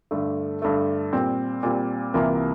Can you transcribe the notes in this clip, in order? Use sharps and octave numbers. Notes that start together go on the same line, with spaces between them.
G2 D3 A3
G2 D3 A3
A#2 G3 C4
A#2 G3 C4
C2 C3 E3 A#3 F4